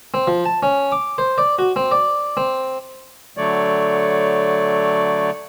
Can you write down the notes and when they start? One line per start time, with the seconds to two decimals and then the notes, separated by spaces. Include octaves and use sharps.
0.14 C4
0.27 F3
0.46 A5
0.63 C#4
0.92 D6
1.18 C5
1.38 D5
1.59 F#4
1.76 C4
1.91 D5
2.37 C4
3.37 D3 F#3 A3 C#5 D5